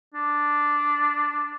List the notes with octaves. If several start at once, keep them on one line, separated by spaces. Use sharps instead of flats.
D4